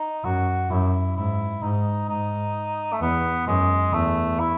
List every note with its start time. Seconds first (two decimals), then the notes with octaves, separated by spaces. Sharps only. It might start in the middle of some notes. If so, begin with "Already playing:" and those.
Already playing: D#4
0.24 F#2 F#4
0.70 F#2 E4
1.16 G#2 E4
1.62 G#2 D#4
2.09 G#2 D#4
2.92 A3
3.01 E2 B3
3.47 F#2 G#3
3.93 E2 A3
4.40 E4